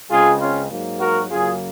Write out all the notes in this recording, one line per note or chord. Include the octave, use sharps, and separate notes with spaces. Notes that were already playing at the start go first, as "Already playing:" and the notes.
C#2 C#3 G#3 C4 F4 G#4
C#4 F4
G#2 F#3 A#3
F#4 A#4
F#2 C#3 F#3 A#3 F4 G#4